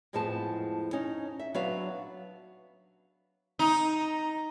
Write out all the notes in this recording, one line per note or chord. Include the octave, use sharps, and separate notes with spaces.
F2 A2 F3 G#3 B3 A5
C#4 D#4
E5
F#3 B3 D4 F#4 E5 F5
D#4